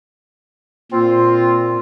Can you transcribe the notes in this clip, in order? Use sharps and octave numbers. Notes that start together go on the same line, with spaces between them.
A#2 C4 F4